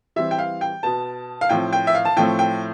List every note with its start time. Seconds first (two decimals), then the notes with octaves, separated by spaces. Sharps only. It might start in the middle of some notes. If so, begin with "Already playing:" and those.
0.16 E3 G3 C4 E5
0.31 G5
0.38 F5
0.61 G5
0.83 B2 B3 A5
1.41 F5
1.49 A2 F3 C4 G5
1.73 G5
1.87 E5
1.95 F5
2.05 A5
2.17 A2 F3 A3 C4 G5
2.39 G5